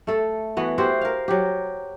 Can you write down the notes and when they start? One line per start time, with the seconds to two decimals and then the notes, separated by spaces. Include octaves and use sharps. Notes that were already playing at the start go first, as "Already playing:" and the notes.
0.07 A3 A4
0.57 E3 B3 F#4
0.78 E4 F#4 G4 C5
1.01 A#4 F5
1.28 F#3 G4